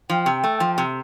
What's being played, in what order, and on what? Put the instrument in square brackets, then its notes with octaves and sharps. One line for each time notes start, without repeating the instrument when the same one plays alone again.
[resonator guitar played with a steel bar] F3 [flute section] G5
[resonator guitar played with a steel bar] C3
A3
F3
C3